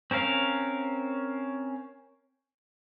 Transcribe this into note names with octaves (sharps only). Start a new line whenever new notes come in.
C4 C#4 A#4 F5